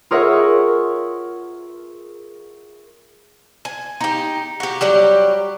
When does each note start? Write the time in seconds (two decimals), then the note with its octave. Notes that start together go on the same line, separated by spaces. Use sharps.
0.11 F4 G#4 A#4 C#5 E5 F#5
3.65 G#5
4.01 D#4 G4
4.60 F#4 G4
4.81 F#3 G3 G4